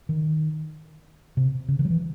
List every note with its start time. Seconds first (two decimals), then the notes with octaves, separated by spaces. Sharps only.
0.09 D#3
1.37 C3
1.68 C#3
1.79 D#3
1.85 F#3
1.90 E3